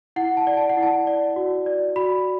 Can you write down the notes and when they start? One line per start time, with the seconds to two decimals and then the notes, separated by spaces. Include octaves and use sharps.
0.16 E4 F#5
0.37 A5
0.47 D5
0.57 A5
0.69 F#5
0.77 E4
0.83 A5
1.07 D5
1.36 F#4
1.66 D5
1.96 F#4 B5